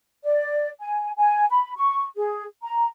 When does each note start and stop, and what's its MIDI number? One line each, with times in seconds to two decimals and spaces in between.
0.24 0.68 74
0.80 1.11 80
1.18 1.46 80
1.50 1.73 83
1.76 2.05 85
2.17 2.45 68
2.63 2.87 82